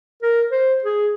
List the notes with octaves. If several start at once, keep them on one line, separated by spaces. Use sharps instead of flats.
A#4
C5
G#4